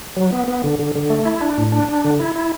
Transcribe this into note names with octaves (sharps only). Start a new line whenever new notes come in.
F#3
B3
B3
D3
D3
D3
A3
E4
D4
A2
D4
D4
D3
E4
E4